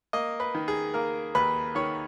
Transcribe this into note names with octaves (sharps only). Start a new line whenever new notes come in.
A#3 D#5
B4
D#3
G#4
A#3 A#4
D#2 B4
D#3 C#5